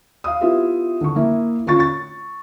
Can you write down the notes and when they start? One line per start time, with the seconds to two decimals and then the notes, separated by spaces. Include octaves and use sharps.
0.24 F5 D#6
0.41 B3 E4 F4 G4 E5
1.01 D3 C#6
1.16 A#3 E4 E5
1.66 D3 C#4 F4 C#5 C#6 A6
1.79 C#6 A6